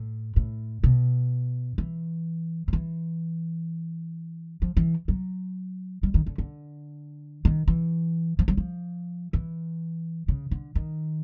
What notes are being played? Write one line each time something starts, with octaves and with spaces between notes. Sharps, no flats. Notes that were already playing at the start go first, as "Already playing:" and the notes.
Already playing: A2
A2
B2
E3
F3
E3
F3
E3
F#3
G3
D#3
D3
D3
D#3
E3
F3
F#3
F3
E3
C#3
D3
D#3